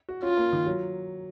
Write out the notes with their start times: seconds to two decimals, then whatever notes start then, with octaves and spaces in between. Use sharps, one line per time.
0.09 F#4
0.22 C#4 F4
0.37 A#3
0.53 D#3
0.66 F#3